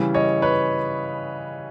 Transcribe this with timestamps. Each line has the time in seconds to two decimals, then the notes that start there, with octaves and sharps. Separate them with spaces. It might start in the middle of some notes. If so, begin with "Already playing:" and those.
Already playing: C#3 E3 G3
0.14 C#5 D#5
0.42 B4 C#5